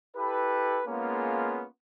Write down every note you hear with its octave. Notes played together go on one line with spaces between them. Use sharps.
E4 G4 A4 B4
G#3 A#3 B3 C#4 F4 G#4